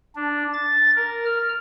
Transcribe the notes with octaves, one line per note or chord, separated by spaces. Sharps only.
D4
A6
A#4
F6